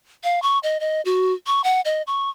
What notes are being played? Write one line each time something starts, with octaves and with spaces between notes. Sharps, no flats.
F5
C#6
D#5
D#5
F#4
C#6
F#5
D#5
C#6